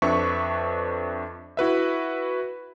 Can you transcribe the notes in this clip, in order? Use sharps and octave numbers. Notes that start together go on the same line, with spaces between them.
F2 D4 B4 E5 C#6 B6
E4 F#4 B4 E5